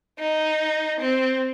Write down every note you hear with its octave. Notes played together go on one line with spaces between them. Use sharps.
D#4
C4